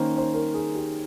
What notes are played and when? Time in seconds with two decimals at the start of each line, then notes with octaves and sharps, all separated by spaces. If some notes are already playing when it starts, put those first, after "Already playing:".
Already playing: D#3 A#3 C#4 A#4 C5
0.18 C5
0.34 A#4
0.54 G#4
0.75 G4